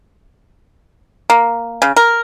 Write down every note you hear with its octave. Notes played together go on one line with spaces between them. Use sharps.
A#3
C#3
A#4